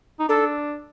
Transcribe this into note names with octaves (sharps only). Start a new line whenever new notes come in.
D#4
D4 A4